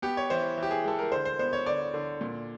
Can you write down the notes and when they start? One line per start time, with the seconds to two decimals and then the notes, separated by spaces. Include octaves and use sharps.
0.02 B3 G4
0.17 C#5
0.30 E3 C5
0.57 E3
0.63 G4
0.71 G#4
0.84 G#3 A4
0.99 A#4
1.12 D3 C5
1.25 C5
1.39 B3 C5
1.53 C#5
1.66 D3 D5
1.94 D3
2.21 A#2